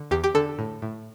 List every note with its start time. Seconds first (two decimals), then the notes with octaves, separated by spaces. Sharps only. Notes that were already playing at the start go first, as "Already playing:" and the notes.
Already playing: D3
0.11 E2 G4
0.24 G4
0.35 D3 A4
0.59 A2
0.82 A2